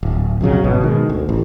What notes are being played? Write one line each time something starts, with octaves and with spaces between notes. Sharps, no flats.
D1
B1 F2 C#3 F#3
G#1 B2
B2 D#3 G#3
D2
A1